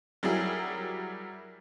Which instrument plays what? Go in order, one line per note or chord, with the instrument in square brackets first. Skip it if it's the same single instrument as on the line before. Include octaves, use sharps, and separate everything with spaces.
[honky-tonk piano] F#3 G3 E4 G#4 A#4